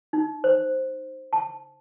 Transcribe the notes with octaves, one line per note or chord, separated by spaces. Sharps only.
D#4
C5
A5